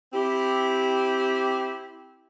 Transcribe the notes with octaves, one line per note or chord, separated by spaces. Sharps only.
C4 E4 G4